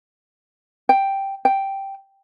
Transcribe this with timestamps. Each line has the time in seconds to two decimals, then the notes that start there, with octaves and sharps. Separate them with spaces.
0.89 G5
1.45 G5